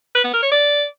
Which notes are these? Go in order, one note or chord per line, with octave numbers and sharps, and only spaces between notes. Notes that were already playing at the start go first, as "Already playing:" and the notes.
B4
B3
A#4
C#5
D5